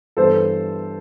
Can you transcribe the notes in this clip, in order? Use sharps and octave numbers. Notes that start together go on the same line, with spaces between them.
G2 E3 B3 A4 C5